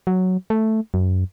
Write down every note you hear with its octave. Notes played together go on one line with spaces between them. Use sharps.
F#3
A3
F#2